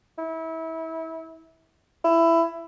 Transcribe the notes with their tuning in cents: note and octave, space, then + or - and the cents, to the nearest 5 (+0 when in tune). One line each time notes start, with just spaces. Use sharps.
E4 -30
E4 +15